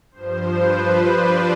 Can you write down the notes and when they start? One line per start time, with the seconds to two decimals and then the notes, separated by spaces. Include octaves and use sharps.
0.12 G2 F3 C5
0.57 B4
1.01 D5